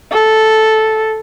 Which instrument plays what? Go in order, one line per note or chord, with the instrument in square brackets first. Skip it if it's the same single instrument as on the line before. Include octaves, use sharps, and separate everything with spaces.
[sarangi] A4